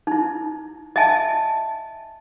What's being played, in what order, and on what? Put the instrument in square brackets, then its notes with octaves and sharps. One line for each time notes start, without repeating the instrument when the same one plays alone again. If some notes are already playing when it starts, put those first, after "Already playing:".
[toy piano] D#4 E4
D#5 E5 G#5 A5